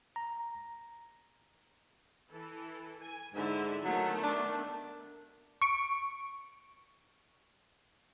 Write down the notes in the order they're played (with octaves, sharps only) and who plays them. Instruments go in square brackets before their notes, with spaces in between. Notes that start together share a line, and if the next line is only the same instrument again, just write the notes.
[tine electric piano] A#5
[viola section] E3 A4
G#5
[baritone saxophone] G#2 [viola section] D3 E4 E5
[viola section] D#3 A3 B3 [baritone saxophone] F#3
[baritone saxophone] D4
[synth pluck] C#6 D7